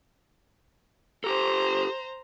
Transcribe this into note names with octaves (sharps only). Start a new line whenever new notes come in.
G4 A4 C5 A#5